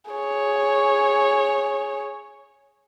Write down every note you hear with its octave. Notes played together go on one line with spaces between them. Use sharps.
G#4 C#5